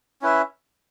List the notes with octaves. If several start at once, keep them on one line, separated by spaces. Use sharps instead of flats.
C#4 E4 B4 E5